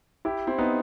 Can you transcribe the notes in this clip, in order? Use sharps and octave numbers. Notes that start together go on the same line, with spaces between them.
E4 G4
C4 E4
B3 D#4